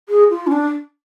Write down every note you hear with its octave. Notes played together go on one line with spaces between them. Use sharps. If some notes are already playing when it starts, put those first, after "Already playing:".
G#4
F4
C#4
D4